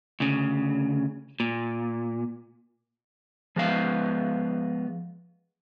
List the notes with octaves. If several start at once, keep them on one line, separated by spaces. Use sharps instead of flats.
D2 C#3
A#2
F3 G#3 B3 F5